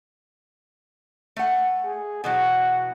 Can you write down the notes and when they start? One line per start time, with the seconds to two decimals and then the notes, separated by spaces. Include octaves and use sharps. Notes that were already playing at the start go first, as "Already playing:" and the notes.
1.36 A3 F#5
1.85 G#4
2.24 B2 E3 F#3 F#5